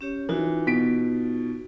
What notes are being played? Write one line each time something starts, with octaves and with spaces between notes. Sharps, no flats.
C#4 G4 C#5
E3 D#4 F4 F#4
B2 B6 D7